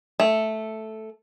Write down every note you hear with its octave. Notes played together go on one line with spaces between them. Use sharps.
A3